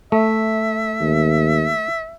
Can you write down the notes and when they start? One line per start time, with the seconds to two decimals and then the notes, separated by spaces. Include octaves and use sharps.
0.12 A3 E5
1.01 D#2